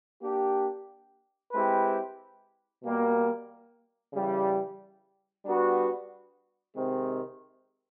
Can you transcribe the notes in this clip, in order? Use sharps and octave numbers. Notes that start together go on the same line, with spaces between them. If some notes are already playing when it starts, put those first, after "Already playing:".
A#3 D4 G4
G#3 C4 E4 G4 B4
B2 G3 A#3
C#3 E3 G3
G3 B3 D4 F#4 B4
C3 D#3 G#3 C4